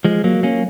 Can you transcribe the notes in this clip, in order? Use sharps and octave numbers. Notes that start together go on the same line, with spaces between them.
F3 G#3
F#3 A#3
A#3 C#4